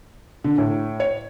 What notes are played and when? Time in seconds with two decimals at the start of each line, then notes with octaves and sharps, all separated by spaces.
0.44 D3
0.58 A2
1.00 C#5